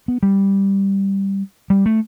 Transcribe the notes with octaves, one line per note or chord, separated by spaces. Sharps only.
B3
G3
G3
A3